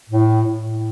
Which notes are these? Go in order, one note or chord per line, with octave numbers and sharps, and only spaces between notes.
A2
A2